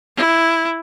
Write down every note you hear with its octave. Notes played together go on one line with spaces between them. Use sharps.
E4